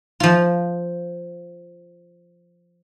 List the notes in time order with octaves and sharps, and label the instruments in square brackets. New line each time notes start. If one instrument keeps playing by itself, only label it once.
[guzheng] F3 F4